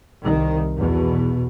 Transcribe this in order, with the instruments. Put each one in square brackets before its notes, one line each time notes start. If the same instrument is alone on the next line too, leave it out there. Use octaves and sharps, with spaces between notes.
[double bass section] C2 D#3
E2 B2